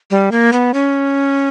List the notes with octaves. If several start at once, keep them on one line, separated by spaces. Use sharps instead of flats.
G3
A#3
B3
C#4